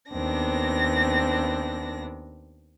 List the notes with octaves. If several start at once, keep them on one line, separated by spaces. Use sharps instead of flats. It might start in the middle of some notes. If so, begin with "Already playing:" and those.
D#2 B3 C4 D4 A#6